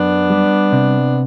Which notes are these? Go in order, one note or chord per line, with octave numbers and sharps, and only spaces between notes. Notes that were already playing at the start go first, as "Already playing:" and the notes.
Already playing: F#2 B3 D4
G3
C3